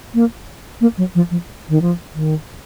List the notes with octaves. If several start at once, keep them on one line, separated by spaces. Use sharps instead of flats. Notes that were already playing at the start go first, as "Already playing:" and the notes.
A#3
A#3
F#3
F3
F3
D#3
F3
D#3